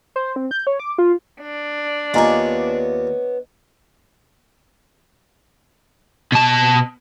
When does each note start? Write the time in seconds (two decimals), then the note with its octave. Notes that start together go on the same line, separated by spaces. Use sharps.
0.16 C5
0.36 C4
0.51 G6
0.67 C#5
0.80 D6
0.98 F4
1.41 D4
2.14 D#2 B3 F4 C#5 D#5 G#5 A#5
6.32 B2 A5